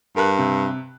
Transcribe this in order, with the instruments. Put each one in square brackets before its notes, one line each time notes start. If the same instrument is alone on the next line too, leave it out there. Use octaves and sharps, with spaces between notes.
[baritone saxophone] G2 [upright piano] A#4 F#6
[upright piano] C3